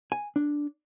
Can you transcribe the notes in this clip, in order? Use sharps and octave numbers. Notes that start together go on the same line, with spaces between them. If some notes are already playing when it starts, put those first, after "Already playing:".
G#5
D4